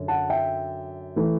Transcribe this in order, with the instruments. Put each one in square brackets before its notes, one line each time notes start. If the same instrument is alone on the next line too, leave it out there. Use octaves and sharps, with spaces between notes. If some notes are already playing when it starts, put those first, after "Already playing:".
Already playing: [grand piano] F#2 D3
F#5 A5
E5 G5
E3 A3